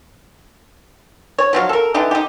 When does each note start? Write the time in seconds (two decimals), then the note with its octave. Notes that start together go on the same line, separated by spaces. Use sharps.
1.38 C#5
1.53 F3 F#3 F5
1.69 A4 A#4
1.94 D3 E3 D#4 G4
2.11 D#4 G4